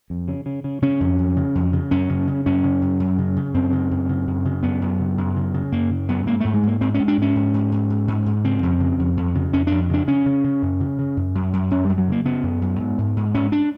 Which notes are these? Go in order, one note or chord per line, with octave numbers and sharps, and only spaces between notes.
F2
C#3
C#3
C#3
C#3 C#4
F2
F2
C#3
F2
C#3
F#2 C#4
C#3
C#3
F#2 C#4
C#3
F#2
F#2
C#3
C#3
F#2 C4
C#3
F#2
C#3
F#2
C#3
F#2 B3
F#2
C#3
F#2
C#3
C#3
F#2 A#3
C#3
F#2 B3
G#2 A#3
G#2 A3
G#3
G#2 A#3
G#2 C4
C#4
G#2
D4
G#2 C#4
G#2
G#2
G#2
G#2
G#2
G#2
C#3 C4
F2
C#3
F2
F2
C#3
F2 C#4
F2 D4
C#3 D4
C#3 C#4
C#3
C#3
F#2
C#3
C#3
F#2
F#2
F#2
F#2 C#4
F#2 G3
F#3
C#3 A#3
C#3 B3
F#2
F#2
G#2
G#2
G#2
G#2 C#4
D4